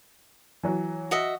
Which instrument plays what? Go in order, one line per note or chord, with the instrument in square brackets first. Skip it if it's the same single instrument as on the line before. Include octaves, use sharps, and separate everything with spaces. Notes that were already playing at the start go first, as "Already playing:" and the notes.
[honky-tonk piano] E3 F#3
[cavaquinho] F#4 D#5 E5